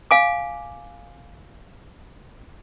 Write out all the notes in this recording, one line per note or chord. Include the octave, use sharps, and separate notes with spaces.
F5 G#5 D6